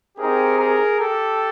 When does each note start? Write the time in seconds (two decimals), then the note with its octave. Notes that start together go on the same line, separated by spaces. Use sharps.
0.17 C4 D#4 G4 G#4 A#4
0.58 G#4 A#4
0.98 G4 A4